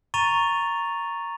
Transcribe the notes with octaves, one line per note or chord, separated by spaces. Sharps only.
A#5 C#6 A6 D#7 F7